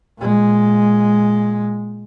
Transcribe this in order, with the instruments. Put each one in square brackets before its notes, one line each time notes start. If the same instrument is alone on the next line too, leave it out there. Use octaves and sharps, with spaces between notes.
[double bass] A#2 G#3